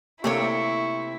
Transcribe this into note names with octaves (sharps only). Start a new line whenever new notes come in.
C3 A3 A#3 C4 E4 G4 C#5 C#6